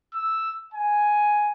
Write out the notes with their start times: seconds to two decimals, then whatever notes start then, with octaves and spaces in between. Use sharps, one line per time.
0.14 E6
0.74 G#5